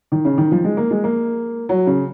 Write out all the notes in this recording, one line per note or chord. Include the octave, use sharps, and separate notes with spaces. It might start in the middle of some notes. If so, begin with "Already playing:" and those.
D#3
C#3
D#3
F3
G#3
A#3
G#3
A#3
F#3
C#3